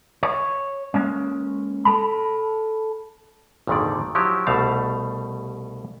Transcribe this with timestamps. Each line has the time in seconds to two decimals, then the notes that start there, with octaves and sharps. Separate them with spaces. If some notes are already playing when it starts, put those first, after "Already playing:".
0.23 C#5
0.94 G#3 A#3 C#4
1.85 A4 A5 B5
3.67 G#1 F2 A#2 D3 D#3 D5
4.15 F3 F#3 E4 G4
4.47 C2 B2 G3 A3 F5 A5